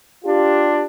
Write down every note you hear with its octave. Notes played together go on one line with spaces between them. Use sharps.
D4 F4 G4